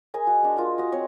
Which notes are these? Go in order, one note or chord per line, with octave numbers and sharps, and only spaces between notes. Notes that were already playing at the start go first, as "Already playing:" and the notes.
G#4 A#4 D#5 G#5
F#4
G#3 D4
F4 A#4 D#5
F#4 D#5
C4 C#5 D#5